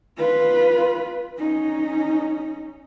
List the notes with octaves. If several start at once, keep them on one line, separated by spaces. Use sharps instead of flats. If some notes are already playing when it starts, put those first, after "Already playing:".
F4 B4
C#4 D#4